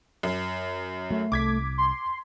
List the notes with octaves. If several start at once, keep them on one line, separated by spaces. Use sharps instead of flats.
F#2
F#3 A3
C2 D6 G#6 B6
C6